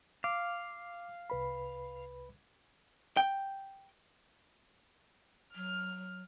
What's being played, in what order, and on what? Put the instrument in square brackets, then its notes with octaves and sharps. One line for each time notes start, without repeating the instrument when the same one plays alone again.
[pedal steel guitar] F5 [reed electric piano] D6
[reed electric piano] C2 B4 B5
[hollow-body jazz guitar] G5
[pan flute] F#3 [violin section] F6